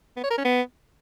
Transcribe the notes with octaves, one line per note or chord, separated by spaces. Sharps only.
B3
C#5
A#4
C#4
B3